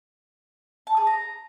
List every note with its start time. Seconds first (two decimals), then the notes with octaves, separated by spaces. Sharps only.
0.87 A5
0.97 G#4
1.07 A#5